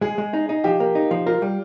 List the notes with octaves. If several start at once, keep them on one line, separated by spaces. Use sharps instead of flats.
G#3 G#4
G#3
D#4
D#4
F3 G4
A#3
D#4
F3
F4 A#4
G3